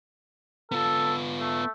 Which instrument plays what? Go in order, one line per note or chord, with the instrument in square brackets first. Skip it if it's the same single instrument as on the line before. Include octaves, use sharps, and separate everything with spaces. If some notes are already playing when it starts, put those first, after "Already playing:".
[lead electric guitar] B3 F4 [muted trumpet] A4
[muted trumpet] A3